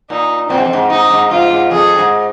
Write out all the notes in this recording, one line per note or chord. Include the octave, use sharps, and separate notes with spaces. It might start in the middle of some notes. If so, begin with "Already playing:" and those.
A#2 D#4
A#2 C4
G#2
F2
G#2
G#2 D#4
G#2
G#2 F4
G#2
F2 G#4
G#2